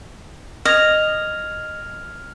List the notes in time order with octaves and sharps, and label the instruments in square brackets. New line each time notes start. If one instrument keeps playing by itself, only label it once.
[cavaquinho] D#5 [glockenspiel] F6 G#6 F7